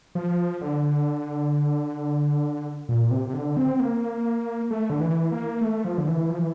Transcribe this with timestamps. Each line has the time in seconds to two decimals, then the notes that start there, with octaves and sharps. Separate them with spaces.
0.15 F3
0.61 D3
2.89 A#2
3.11 C3
3.28 C3
3.33 D3
3.57 C4
3.80 A#3
4.71 A3
4.90 D3
5.00 E3
5.32 A#3
5.61 A3
5.85 F3
5.98 D3
6.08 E3
6.30 F3
6.39 E3